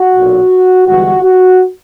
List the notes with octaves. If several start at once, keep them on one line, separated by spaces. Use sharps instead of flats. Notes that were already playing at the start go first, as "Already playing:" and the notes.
Already playing: F#4
B1 A#2 F#3
G1 G2 E3 G#3 F#4
F#4